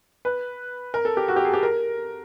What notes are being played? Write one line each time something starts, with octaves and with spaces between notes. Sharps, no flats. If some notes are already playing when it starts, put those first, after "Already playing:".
B4
A#4
A4
G4
F#4
G4
G#4
G4
A#4